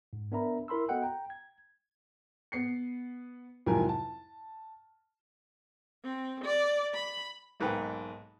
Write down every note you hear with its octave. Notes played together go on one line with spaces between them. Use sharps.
G#2
B3 D4 A#4 E5 A#5 B5
E4 A#4 B5 C6 E6
B3 F#4 A4 D#5 F#5 G5
G5 A#5
G#6
B3 C7 C#7
C2 F2 G#2 F#3 A#4 G#5
A5
C4
D5
B5
B1 G#2 A#3 B4 G5